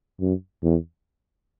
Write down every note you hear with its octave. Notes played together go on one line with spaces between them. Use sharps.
F#2
E2